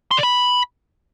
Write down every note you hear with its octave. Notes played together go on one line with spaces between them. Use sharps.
C6
D5
B5